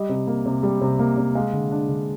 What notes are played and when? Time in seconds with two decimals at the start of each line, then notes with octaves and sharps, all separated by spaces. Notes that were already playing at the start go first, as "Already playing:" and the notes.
Already playing: G3 D#5
0.09 C3
0.27 A#3
0.46 C3
0.63 G3
0.81 C3
0.99 A#3
1.17 C3
1.35 G#3 F5
1.53 D3
1.71 D4
1.89 D3